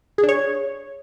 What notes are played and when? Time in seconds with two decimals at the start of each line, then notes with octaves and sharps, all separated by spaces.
0.18 G#4
0.23 D4
0.29 C#5